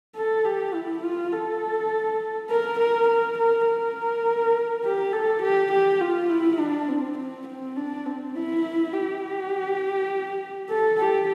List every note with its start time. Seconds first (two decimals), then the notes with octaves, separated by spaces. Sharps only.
0.16 A4
0.45 G4
0.74 E4
1.03 F4
1.32 A4
2.50 A#4
2.79 A#4
3.08 A#4
3.38 A#4
3.67 A#4
4.84 G4
5.13 A4
5.42 G4
5.72 G4
6.01 F4
6.30 E4
6.59 D4
6.88 C4
7.18 C4
7.48 C4
7.77 D4
8.06 C4
8.36 E4
8.93 G4
10.70 A4
10.99 G4